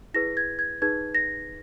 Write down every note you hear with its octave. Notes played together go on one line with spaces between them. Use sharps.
E4 G#4 B4 A#6
G#6
G#6
D#4 G#4 B4 G#6
A#6